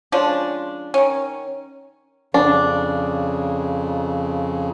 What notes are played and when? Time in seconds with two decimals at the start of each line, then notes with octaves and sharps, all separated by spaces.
0.12 F3 G#3 C#4 D4
0.94 D#3 C#4
2.34 F2 C#3 D4